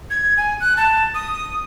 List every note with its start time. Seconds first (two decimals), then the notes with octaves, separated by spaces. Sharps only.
0.10 G#6
0.37 G#5
0.61 F#6
0.77 A5
1.14 D#6